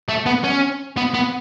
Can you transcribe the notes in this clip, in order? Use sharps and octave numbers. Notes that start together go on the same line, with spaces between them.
A3
B3
C#4
B3
B3